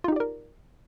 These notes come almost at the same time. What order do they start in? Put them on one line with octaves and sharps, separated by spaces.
F4 D#4 G4 D5 A#4